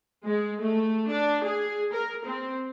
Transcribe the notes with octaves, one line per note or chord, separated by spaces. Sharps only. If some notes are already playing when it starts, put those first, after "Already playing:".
G#3
A3
D4
G#4
A#4
C4